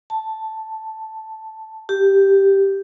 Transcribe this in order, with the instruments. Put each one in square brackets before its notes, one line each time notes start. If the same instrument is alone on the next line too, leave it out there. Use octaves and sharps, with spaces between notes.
[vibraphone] A5
G4